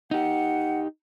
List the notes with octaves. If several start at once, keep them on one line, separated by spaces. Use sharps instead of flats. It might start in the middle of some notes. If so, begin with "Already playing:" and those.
D#4 G4 F#5